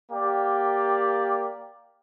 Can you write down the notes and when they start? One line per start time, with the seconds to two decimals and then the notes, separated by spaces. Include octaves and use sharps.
0.11 A#3 G4 D5